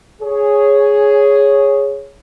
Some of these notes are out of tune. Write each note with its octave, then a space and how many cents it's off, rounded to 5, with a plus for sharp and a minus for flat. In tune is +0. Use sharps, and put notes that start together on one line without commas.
G#4 +0 C#5 +0